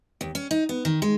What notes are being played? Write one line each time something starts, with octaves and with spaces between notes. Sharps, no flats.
D#2
C#4
D#4
B3
D#3
G#3